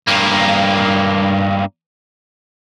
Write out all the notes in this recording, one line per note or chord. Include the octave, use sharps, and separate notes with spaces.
G2 A#3